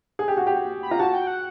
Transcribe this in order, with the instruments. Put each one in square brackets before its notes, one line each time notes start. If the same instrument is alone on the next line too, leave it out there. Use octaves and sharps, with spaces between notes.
[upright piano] G#4
G4
F#4
G4
[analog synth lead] B5
[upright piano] F4 [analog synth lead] A#5
[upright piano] F#4 [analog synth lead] A5
[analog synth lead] G5
F#5